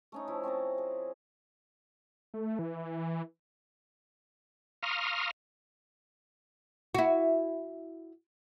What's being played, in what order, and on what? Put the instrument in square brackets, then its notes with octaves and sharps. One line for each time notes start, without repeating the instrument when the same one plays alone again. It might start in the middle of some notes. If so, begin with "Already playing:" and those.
[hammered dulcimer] A3 C#4 D#4
F3 E4
C4 C#4 A4 A#5
G#4
[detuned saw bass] A3
E3
[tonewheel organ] F5 A#5 C6 C#6 D#6 F6
[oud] E4 F#4